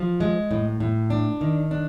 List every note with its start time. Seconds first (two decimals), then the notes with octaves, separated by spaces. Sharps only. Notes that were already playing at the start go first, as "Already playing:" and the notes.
Already playing: F3
0.20 G#3
0.51 A2
0.80 A2
1.10 D4
1.41 D#3
1.71 D4